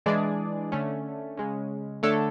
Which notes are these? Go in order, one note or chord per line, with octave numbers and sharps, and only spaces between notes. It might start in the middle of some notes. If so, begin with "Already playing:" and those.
E3 G#3 D4 G#4 D5
D3 A3 C#4
C#3 G#3 C#4
D3 A3 D4 A4 C#5